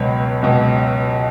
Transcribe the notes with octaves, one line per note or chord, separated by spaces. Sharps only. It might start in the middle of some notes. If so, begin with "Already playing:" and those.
Already playing: C#2 B2 F#3 C#5
C#2 B2 F#3